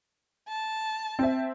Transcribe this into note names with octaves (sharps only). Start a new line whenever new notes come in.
A5
C4 E5